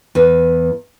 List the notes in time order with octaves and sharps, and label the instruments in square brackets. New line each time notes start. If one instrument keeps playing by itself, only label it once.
[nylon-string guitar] E2 B4